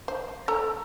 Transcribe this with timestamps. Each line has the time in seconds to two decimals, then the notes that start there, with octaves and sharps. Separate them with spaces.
0.08 C5
0.48 A4 A#5